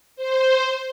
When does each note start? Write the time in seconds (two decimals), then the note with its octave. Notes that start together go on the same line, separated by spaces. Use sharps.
0.16 C5